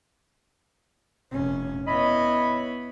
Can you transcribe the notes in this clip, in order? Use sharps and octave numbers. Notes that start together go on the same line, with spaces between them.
F1 C#4
B3 E4 C#5 D#5 B5